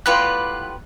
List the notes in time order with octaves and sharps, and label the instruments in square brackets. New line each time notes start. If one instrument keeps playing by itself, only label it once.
[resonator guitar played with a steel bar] A2 B3 F4 [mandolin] G4 B4 D5 [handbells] F#6